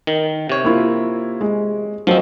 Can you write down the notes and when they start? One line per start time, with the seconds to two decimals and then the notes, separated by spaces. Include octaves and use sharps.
0.07 D#3
0.49 C3 C#5
0.64 A#3 E4 F4
1.41 G#3
2.07 F3 F#3 C4 C5 D#5